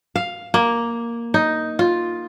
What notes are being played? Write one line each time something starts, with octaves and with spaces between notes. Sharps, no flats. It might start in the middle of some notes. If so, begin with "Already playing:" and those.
F5
A#3
D#4
F4